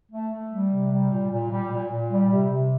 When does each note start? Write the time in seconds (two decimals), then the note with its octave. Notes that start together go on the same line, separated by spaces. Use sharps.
0.12 A3
0.32 A3
0.51 G3
0.71 C3
0.91 G3
1.11 A#2
1.30 A#2
1.51 G3
1.71 A#2
1.90 A#2
2.10 G3
2.30 C3
2.50 C3